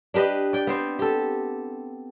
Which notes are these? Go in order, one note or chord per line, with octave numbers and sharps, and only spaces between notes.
D4 G4 B4 D#5
D5 G5
B3 C4 C5
G4 A4